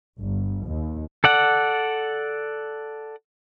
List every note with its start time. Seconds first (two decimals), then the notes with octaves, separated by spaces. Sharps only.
0.18 G1
0.67 D#2
1.24 A4 D5 F#5